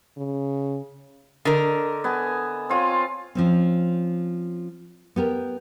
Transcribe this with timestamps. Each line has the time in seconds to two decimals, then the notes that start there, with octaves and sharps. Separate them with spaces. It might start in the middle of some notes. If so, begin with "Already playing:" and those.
0.17 C#3
1.45 D3 A#4 D#5
2.04 B3 G#5 A5
2.69 C4 F4 C#5
3.35 F3 C4 C#4
5.16 B3 G4 A#4